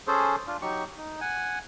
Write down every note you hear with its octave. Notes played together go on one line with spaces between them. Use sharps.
C#4 G#4 A4 C5
D4 F4
F#3 D#4 G4 C#6
D#4
F#5 G#5